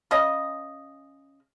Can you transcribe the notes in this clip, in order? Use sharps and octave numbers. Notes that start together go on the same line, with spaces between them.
C#3 C#4 D#5